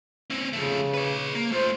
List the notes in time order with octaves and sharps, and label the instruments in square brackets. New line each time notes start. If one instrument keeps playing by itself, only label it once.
[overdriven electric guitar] C4 C#4
[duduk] C#3 [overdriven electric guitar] F3 A3
[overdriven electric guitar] B4 C#5
A#3
[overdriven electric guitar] A3 F4 [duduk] C5